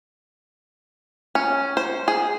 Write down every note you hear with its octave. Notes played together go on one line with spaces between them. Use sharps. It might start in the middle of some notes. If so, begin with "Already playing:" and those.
C#4
C5
G#4